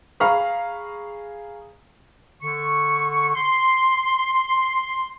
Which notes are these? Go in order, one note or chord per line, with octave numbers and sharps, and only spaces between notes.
G#4 F5 A#5 B5 C#6 F6
D3 C#6
C6